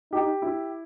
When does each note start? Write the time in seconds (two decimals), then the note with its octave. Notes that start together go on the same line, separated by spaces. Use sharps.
0.12 D#4 G4
0.42 E4